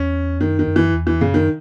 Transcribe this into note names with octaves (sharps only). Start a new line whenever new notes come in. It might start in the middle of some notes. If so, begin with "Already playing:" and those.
Already playing: E2 C#4
F#2 D#3
D#3
F#2
E3
E2
E3
F#2 C#3
D#3